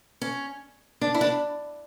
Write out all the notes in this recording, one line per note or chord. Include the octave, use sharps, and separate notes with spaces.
C#4
D4
E4
D4